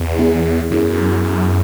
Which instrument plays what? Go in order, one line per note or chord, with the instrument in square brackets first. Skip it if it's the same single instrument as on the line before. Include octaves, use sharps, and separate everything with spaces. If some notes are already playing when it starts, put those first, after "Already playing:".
Already playing: [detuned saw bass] E2
[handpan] B3 E4 G#4
[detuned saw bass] F#2 [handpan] B3 E4 G#4